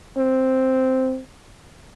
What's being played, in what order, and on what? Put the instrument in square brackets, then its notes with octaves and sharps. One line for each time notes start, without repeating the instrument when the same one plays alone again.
[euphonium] C4